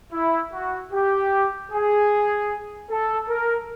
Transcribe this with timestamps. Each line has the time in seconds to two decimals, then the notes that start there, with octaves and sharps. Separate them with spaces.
0.11 E4
0.51 F#4
0.91 G4
1.70 G#4
2.89 A4
3.28 A#4